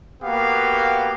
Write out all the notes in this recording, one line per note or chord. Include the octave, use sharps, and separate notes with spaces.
A#3 B3 F#4 G4 F5